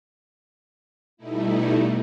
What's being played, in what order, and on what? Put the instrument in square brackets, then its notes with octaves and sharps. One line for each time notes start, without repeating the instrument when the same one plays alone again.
[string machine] B2 G3 A3 D#4 E4